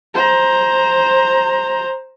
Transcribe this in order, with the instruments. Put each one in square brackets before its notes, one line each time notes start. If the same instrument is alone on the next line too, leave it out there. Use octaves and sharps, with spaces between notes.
[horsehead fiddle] C5 A#5